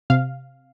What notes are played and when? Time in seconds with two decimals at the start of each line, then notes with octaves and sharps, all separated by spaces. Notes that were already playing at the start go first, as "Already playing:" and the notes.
0.10 C3 F5